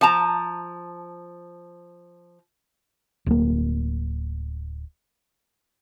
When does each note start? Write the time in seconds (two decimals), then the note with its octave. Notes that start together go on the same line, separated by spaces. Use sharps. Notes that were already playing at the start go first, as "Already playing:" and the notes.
0.01 F3 A5 A#5
3.26 D1 A#3